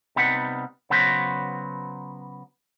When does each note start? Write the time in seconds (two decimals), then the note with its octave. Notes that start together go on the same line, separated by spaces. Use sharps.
0.16 C3 G3 B3 D#4 B4 F#5
0.90 C#3 F#3 B3 F#4 B4 C5